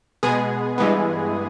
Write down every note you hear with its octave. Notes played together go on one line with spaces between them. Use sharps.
B2 G#3 B3 G#4
G2 E3 G#3 B3